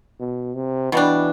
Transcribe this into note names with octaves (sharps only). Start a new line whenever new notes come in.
B2
C3
B2 E3 G3 D4